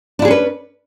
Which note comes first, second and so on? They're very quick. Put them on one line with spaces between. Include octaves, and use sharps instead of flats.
D4 E4 G#4 C#4 B4